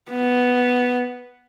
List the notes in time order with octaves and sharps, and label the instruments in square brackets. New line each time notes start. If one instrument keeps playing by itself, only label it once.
[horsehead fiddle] B3